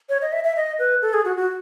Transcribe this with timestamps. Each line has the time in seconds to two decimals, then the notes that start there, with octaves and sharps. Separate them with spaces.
0.09 C#5
0.22 D#5
0.32 E5
0.44 E5
0.56 D#5
0.79 B4
1.02 A4
1.14 G#4
1.25 F#4
1.37 F#4